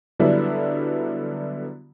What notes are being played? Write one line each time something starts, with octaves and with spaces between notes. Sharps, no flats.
D3 F#3 G3 B3 D4 E4